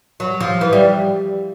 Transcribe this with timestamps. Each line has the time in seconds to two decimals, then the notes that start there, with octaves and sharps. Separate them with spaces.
0.20 F#3
0.40 F3
0.61 E3
0.73 G3